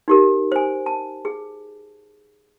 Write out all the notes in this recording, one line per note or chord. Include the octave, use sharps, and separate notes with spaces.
D#4 G4 A#4
C5 G#5
A5
G#4